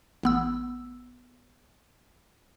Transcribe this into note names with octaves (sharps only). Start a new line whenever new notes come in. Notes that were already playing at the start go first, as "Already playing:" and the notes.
A1 B3 E6